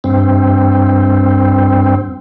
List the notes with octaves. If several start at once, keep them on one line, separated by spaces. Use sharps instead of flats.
G2 C4